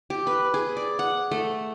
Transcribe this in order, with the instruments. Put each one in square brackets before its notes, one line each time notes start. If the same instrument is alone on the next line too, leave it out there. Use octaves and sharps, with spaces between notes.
[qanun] G4
B4
G#4
D5
F#5
A3